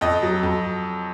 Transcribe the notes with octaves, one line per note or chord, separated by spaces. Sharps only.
F2 D#5
F#3
F2